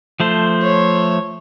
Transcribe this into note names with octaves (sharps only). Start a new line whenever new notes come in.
F3 A3 C5
C#5